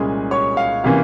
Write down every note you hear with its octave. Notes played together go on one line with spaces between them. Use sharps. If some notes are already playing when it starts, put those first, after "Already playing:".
Already playing: C2 A#2 G#3 C#4 G#4
C#5 C#6
F5
C3 E3 A#3 C#4 F5